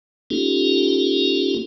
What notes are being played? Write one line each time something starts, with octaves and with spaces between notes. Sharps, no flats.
A#3 C#4 D#4 F4 G4 A4